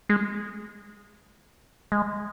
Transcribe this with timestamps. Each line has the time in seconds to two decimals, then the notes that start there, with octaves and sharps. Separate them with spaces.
0.09 G#3
1.92 G#3